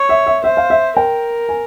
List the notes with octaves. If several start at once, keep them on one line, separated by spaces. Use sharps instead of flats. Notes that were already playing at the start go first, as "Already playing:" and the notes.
Already playing: C#5
E5
E5
C5 E5
F5
E5
A#4 G5
G#5